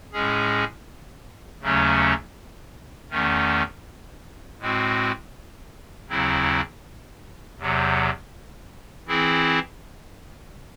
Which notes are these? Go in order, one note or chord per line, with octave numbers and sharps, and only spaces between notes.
A2 G#3 C#4 G#4
D#2 C#3 F#3 A3 C#4
E2 D#3 A3 C#4
A2 G#3 C4 F#4
D#2 C#3 F#3 C4 E4
E2 C3 F#3
E3 C4 E4 G#4